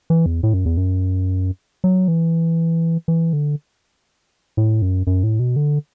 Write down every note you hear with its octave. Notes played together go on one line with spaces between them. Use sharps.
E3
E2
A2
F#2
E2
F#2
F#3
E3
E3
D3
A2
F#2
F#2
A2
B2
D3